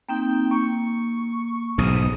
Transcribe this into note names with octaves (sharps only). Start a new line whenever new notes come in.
A#3 C4 D#4 G5
A#3 C#6
B1 G#2 D#6